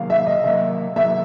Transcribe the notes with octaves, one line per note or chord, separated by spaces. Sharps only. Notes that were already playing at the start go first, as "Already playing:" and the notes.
Already playing: C3 D#3 F#3 A#3 F5
E5
D#5
C3 D#3 F#3 A#3 E5
C3 D#3 F#3 A#3 E5